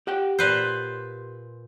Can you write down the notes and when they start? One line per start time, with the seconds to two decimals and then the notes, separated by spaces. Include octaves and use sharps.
0.07 G4 F#5 G5
0.39 A#2 B4 C5